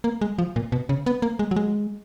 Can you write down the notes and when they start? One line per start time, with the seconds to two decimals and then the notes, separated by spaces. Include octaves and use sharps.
0.04 A#3
0.21 G#3
0.38 F3
0.56 A#2
0.72 B2
0.89 C#3
1.06 B3
1.22 A#3
1.39 G#3
1.51 F#3
1.56 G#3